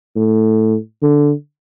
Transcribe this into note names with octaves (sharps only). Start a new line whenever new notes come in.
A2
D3